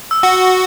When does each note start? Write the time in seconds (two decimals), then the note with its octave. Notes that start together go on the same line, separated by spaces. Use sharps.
0.11 E6
0.23 F#4